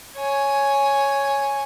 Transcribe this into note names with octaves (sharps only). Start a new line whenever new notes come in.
C#5 G#5